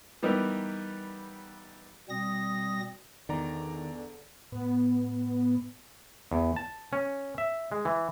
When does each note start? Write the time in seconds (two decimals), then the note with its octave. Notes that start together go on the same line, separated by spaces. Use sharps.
0.23 E3 G3 B3 D#4 G4 A#4
2.09 B2 G3 C4 D#6 A#6
3.29 E2 D3 D#3 D5 A#5
4.52 A2 B3
6.32 E2
6.56 A5
6.93 C#4
7.38 E5
7.72 G#3
7.85 E3